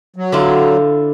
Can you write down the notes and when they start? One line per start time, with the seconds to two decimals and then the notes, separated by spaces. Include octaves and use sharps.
0.16 F#3
0.32 D3 E4 F4